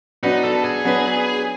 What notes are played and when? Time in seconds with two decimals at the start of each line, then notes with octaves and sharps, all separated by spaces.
0.23 F#3 B3 D4 D#4 F#4 B4
0.44 A4
0.55 A4
0.64 G#4
0.84 F#3 B3 D4 F#4 B4